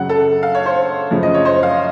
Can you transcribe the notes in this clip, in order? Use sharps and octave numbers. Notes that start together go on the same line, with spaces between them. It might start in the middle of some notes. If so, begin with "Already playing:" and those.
Already playing: F#2 C#3 F#3 F#5
A4
F5
C#5
C5
F#2 C#3 F3
D#5
C#5
C5
F5